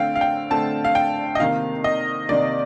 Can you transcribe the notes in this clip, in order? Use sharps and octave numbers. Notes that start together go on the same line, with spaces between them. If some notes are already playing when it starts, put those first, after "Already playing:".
Already playing: D3 A3 C4 F5 G5
F5
G5
D3 A3 C4 A5
F5
G5
D#5
C3 D#3 A#3 F5
D#5
C3 D#3 A#3 D5